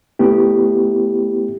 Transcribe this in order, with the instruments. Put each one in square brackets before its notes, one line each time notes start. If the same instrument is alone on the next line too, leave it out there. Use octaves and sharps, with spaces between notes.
[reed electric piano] A3 B3 E4 G4